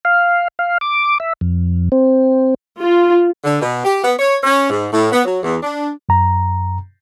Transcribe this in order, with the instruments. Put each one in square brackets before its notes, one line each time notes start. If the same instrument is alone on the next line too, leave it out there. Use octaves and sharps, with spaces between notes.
[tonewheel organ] F5
F5
D6
E5
F2
C4
[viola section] F4
[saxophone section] D3
B2
G4
B3
C#5
C#4
G#2
A2
B3
F#3
E2
D4
[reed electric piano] F#2 A#5